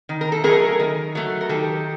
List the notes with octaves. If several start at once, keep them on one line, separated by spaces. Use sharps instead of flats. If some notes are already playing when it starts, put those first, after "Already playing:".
D#3
A#4
A4
F#3 A3 G#4 A#4
D#3
F#3 A3
A#4
D#3 G4 A4